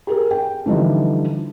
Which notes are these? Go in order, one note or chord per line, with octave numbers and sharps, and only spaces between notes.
G4 G#4 A#4
G5
D3 E3 F3 G3 D#4